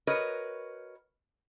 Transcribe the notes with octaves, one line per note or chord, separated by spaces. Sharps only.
F#4 A#4 B4 C#5 D#5